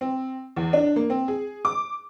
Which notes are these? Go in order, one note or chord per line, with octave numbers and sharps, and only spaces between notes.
C4
E2
D4
A#3
C4
G#4
D6